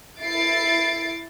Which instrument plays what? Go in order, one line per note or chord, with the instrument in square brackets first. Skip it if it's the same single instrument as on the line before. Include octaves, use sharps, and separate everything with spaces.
[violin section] E4 A6 C7 D7